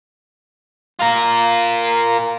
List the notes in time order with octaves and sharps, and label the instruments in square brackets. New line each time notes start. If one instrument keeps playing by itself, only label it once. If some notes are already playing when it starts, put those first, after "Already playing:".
[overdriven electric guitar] F4 A#4